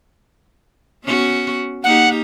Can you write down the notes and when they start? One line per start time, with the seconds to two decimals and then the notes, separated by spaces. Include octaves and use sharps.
1.05 B3 C#4 F#4
1.84 A#3 D#4 G4 F#5